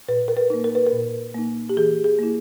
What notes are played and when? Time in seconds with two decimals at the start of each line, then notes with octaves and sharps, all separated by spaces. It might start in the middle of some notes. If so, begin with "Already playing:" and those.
0.08 A#2 B4
0.28 A#4
0.37 B4
0.50 A#3 D#4
0.64 A#4
0.75 B4
0.87 A#4
0.93 A#2
1.34 A#3 D#4
1.69 G4
1.77 E3 G#4
2.04 G#4
2.19 A#3 E4